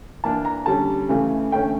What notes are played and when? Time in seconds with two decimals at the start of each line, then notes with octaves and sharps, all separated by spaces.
0.24 E3 A#3 D4 A5
0.45 A#5
0.66 D3 G3 C#4 A5
1.09 C#3 E3 A3
1.52 D3 A3 C#4 G5